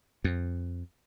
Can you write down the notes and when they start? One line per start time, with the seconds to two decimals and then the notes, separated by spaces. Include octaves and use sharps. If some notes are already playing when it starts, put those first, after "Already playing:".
0.24 F2